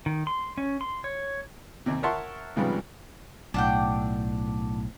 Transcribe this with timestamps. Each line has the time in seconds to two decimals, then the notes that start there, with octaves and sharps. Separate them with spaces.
0.06 D#3
0.27 C6
0.58 C#4
0.81 C6
1.04 C#5
1.86 D#2 C3
2.03 A#4 C#5 E5 F#5 A5 C6
2.56 C2 G#2 C#3 F3 G3 B3
3.54 B1 A2 D4 F#5 G5